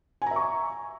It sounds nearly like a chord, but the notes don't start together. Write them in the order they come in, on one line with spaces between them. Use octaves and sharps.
G#5 A#5 E5 C#6